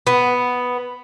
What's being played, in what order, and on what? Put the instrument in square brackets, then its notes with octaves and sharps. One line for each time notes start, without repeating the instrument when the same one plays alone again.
[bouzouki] B3